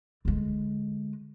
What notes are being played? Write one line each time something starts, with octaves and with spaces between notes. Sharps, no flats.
D3 G#3